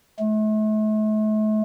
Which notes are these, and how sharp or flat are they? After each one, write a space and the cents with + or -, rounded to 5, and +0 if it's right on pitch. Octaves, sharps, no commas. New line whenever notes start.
A3 -40